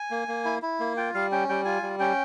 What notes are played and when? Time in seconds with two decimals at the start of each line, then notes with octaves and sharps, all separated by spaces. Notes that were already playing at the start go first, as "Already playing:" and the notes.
Already playing: G#5
0.11 A#3
0.28 A#3
0.45 E4
0.62 E4
0.80 A#3
0.97 F4 G5
1.14 G3 F5
1.32 C#4 G5
1.49 G3 G5
1.65 F4 G#5
1.82 G3
1.99 C#4 G5